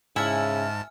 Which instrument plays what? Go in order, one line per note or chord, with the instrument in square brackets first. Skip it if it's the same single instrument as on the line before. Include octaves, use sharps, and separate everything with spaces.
[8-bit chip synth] G#2 A5 [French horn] C#3 [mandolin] E4 [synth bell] G#5 F6